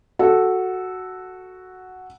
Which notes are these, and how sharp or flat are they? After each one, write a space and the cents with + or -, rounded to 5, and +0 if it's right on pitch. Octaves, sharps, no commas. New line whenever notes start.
F#4 +0 A4 -5